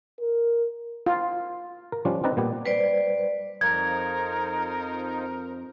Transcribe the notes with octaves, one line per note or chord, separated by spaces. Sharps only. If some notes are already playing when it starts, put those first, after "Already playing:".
A#4
F4
A#4
F3 G3 C#4 D4 F4
C4 D4 D#4 B4 A5 A#5
A#2 G3 B3 G4
G3 B4 C5 D5
F2 F3 D#4 A#4 G#6